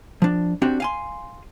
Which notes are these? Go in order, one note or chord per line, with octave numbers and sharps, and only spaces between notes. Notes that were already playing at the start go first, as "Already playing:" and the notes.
F3 D4
C4 D4 F#4 G4
F5 G#5 C6